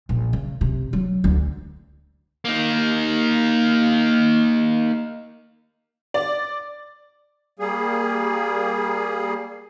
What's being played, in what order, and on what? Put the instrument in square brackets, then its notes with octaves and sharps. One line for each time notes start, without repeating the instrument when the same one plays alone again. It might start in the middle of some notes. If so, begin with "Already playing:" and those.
[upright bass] A#1
C#3
C3
F#3
D2
[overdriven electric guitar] A#3 D#4
[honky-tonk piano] D5
[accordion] G3 A#3 G#4